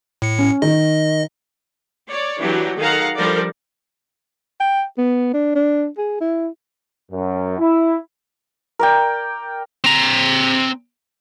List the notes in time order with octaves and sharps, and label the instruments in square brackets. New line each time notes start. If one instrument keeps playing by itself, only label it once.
[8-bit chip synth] A2 C#7
[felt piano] C#4
[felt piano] D#3 [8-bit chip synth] D#5
[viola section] C#5 D5
E3 F#3 D4 G4
D#3 G#4 A4 F5 F#5 A#5
F3 G3 D4 A4 A#4 D5
[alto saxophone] G5
B3
D4
D4
G#4
E4
[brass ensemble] F#2
E4
[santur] A#4 D5 G5
[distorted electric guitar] C4 A#5